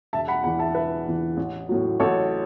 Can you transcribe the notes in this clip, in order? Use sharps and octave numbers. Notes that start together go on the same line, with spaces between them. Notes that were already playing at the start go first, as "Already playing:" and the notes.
E1 E5 A5
F#5 B5
E2 E3 F#5 B5
E5 A5
E1 B4 E5
E2 E3
A1
A2 F#3
A1 A4 C#5